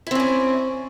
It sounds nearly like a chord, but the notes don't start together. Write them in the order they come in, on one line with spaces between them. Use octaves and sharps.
E4 C4 C#4 D5